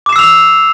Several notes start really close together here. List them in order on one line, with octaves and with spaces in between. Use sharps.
D6 E7 C7 E6 F7